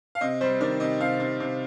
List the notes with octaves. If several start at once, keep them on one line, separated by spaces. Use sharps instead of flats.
F5
C3 D#5
G3 C5
D#3 D5
C3 D#5
C3 F5
C3
C3